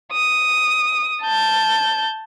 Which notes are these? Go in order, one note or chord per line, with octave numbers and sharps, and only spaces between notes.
D#6
A5 G6